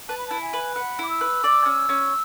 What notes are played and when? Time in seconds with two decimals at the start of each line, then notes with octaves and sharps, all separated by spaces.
0.09 B4 A5
0.18 B5
0.27 E4 A5
0.42 G#5
0.53 B4
0.76 F#5 B5
0.99 E4 D6
1.09 E6
1.21 B4
1.44 D5
1.65 C#4
1.89 C#4